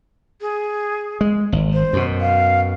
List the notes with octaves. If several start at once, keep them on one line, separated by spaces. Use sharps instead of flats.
G#4
G#3
G#1
C5
F#2 B2
F5